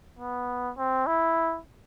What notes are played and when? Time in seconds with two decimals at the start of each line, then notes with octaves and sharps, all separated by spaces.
0.19 B3
0.78 C4
1.06 E4